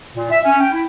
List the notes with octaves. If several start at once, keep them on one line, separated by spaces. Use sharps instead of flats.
A#2
E5
C#4
G5
E4